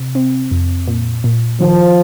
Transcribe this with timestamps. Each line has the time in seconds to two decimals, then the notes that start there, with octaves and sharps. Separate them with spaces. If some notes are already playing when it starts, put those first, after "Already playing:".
Already playing: C3
0.15 C4
0.51 F2
0.87 A#2
1.24 A#2
1.60 D#3 F3